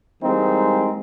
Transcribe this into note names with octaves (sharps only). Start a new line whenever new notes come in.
E3 G3 G#3 A#3 C4 D#4